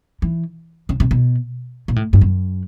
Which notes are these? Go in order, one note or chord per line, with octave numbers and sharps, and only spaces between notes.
E3
C#3
C3
B2
A#2
A2
G2
F#2